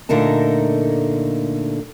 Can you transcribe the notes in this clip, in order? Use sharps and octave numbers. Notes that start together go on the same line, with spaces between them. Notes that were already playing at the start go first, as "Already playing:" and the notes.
A#2 D3 A3 D#4 A#4 A5